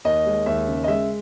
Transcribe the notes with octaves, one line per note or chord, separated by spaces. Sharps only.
D#2 D#5
G#3
D#2 E5
C#3
D#5
G#3 E5